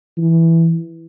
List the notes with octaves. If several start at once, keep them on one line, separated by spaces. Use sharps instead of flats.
E3